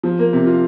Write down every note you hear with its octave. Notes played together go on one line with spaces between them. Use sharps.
F3
A#3
C3
F4